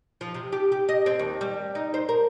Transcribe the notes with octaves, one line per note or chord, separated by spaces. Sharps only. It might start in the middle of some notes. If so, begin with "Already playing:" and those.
F3
C3
G4
G4
D#5
C4
D#2
G3
D#4
C5
A#4